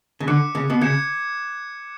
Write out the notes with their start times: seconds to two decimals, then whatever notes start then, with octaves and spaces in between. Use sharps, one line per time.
0.20 C#3
0.27 D3 D6 F#6 C#7
0.55 C#3
0.70 B2
0.81 C#3 G#6 C#7 E7